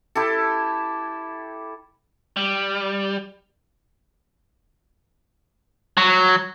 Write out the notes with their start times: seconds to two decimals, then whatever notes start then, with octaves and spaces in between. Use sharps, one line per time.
0.15 E4 G4 A4
2.37 G3
5.97 F#3